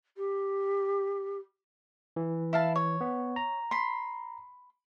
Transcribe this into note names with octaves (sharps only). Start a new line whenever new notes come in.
G4
E3
E4 F5 A5
C#5
B3
A#5
B5 C6